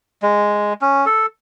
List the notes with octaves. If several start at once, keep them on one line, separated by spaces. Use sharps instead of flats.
G#3
C#4
A4